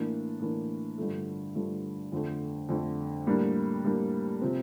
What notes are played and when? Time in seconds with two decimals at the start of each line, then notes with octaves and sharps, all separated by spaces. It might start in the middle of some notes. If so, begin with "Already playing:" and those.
Already playing: A2 E3 A#3 D4
0.40 A2 E3 A#3 D4
0.98 G2 D3 F3 A3
1.55 G2 D3 F3 A3
2.12 F2 D3 A3
2.69 F2 D3 A3
3.26 A2 G3 A#3 D4
3.85 A2 G3 A#3 D4
4.41 C3 F3 C4